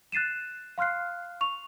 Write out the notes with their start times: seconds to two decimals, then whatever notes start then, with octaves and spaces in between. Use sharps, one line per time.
0.12 F#6 A6 C7 D#7 E7
0.78 F5 C6 F6 F#6 C7
1.41 C#6 F7